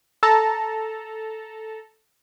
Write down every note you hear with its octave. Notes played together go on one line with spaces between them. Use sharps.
A4 A5 A#5